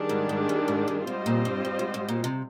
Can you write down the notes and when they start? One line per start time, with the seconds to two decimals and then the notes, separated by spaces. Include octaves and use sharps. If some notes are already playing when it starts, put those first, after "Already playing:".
Already playing: D#3 G3 D4 G#4
0.09 G#2
0.29 G#2
0.49 G2
0.68 G#2
0.88 G2
1.07 G#2 G3 C4 F4 C5 D#5
1.26 A#2
1.45 G2
1.65 G2
1.79 G#2
1.94 G#2
2.08 A#2
2.24 C3